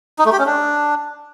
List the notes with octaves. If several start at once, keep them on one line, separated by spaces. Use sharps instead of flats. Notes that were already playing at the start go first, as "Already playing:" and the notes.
D#4
A3
G4
C#4
D4